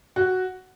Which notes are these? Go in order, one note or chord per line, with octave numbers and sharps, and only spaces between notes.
F#4